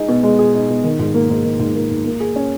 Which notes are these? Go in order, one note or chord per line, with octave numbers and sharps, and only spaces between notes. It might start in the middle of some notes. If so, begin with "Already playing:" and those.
Already playing: G#3 D#4 G#4
B2
G#3
G#4
D#4
B2
D#3
G#2
A#3
G#2
D#3
G#2
A#3
G#2
A#3
G#4
C#4